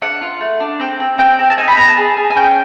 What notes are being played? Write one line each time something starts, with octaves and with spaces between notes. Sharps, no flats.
D4 F#5
F4
A3
D4
C4 G5
C4
C4 G5
C4
A5
D#4 G#5
B5
B3 A#5
A5
G#4
G#4
G#5
C#4 G5